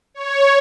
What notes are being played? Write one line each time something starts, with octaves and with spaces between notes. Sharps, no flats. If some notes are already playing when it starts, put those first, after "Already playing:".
C#5